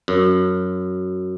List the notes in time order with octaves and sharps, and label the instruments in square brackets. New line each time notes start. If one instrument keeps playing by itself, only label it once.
[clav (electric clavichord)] F#2